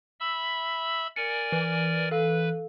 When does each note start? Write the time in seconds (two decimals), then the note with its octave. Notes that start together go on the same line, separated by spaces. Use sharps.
0.20 E5 B5 E6
1.16 A#4 D5 G#5 C#7
1.52 E3
2.11 A4 B4 F5